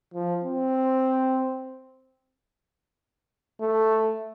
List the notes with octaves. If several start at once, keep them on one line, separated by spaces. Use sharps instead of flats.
F3
C4
A3